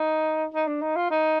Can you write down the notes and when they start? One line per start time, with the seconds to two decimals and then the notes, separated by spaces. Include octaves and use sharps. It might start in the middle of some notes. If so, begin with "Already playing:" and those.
Already playing: D#4
0.54 D#4
0.67 D4
0.82 D#4
0.96 F4
1.10 D#4